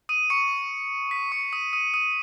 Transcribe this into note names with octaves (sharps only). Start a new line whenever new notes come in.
D#6 D#7
C#6 C#7
B6
C#6 C#7
D#6 D#7
D#6 D#7
D#6 D#7